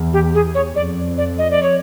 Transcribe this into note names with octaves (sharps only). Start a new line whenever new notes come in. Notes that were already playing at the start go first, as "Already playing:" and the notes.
Already playing: E2
G4
G#4
C#5
F2 D5
D5
D#5
D5
C#5